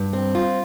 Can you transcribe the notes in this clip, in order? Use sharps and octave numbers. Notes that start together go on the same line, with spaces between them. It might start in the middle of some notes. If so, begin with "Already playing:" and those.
Already playing: G2
C4
F4